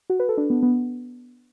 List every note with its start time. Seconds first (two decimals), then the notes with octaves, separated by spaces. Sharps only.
0.10 F#4
0.20 B4
0.29 A4
0.38 D4
0.50 B3
0.63 B3